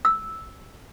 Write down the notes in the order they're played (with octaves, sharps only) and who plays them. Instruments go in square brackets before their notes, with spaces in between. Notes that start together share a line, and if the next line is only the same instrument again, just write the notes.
[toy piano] E6